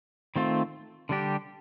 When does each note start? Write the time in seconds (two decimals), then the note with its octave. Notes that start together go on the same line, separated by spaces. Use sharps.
0.36 D#3 A3 C4 F4
1.09 D3 G3 D4 G4